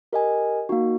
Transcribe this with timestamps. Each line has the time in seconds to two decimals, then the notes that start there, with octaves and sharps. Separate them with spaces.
0.13 G4 A#4 D#5 G#5
0.69 A#3 D#4 F#4